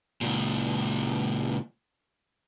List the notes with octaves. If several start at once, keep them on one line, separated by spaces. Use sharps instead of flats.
C#2 A#2